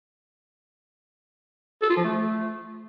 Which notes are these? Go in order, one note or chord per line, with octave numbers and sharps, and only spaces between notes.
A4
F4
F3
A3